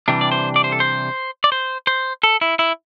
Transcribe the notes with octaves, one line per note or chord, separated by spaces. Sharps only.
C3 E3 G3 D4
D5
C5
D5
C5
A4
C5
D5
C5
C5
A4
E4
E4